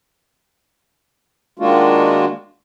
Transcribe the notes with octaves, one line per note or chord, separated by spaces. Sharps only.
D#3 G#3 A#3 D4 F4 F#4